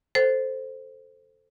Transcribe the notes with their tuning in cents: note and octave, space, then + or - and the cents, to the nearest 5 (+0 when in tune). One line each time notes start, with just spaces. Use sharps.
A4 +0 C5 +0